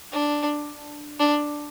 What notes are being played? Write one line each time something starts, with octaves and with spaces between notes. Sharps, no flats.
D4
D4